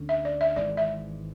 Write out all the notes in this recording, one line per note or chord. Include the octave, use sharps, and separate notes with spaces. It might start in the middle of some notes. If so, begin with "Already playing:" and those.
Already playing: D2 D3 C#4
E5
D5
E5
G#1 G#2 E3 G#3 D5
E5